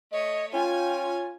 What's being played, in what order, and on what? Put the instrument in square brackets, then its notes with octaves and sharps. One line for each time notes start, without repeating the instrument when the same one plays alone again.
[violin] A3 C#5 [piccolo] D#5
[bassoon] C#4 [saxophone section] F4 [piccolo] G5 [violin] G#5